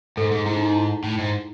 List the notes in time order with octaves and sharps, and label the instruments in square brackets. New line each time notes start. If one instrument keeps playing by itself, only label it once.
[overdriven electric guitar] G#2 [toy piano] A4
[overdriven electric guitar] G#2 [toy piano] G#4
[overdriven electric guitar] G#2 [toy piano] E4
[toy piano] D#4
D#4
E4
[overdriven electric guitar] A2
G#2